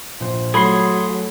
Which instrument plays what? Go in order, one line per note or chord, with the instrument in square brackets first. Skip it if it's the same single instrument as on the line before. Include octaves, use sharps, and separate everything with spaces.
[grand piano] A#1 C5
[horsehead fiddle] F#3 [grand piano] A3 C7 [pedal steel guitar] G#4 B5 C6